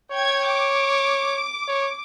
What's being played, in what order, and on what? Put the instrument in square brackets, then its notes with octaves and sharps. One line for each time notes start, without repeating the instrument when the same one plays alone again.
[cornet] C#5 [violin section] G5 G#6
[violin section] D6
[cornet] C#5